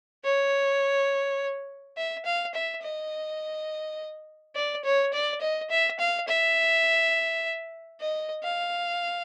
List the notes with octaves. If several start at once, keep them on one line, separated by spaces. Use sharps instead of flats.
C#5
E5
F5
E5
D#5
D5
C#5
D5
D#5
E5
F5
E5
D#5
F5